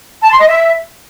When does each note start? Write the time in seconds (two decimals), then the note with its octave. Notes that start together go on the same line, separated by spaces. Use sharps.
0.21 A5
0.30 C6
0.39 D#5
0.48 E5